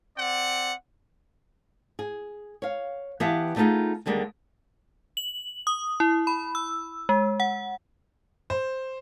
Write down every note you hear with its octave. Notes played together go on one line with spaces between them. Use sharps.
C4 D5 F#5
G#4
C#5 F5
E3 B3 G4 E5 F5 A5
G3 A3 B3 D#4 F4 G#4
D#2 D3 G3 G#3 A#4
F#7
D#6
E4
B5
E6
G#3
F#5
C5